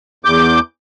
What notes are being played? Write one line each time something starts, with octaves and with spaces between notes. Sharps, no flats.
E2 D6 G6